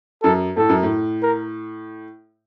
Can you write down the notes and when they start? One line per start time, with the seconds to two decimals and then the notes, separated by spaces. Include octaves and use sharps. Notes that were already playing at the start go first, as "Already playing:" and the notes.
0.23 F#2 A4
0.57 A2 A4
0.69 F#2
0.83 A2
1.23 A#4